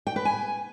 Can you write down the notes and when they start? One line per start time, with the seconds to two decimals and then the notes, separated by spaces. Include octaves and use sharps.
0.07 G5
0.16 B4
0.25 G#5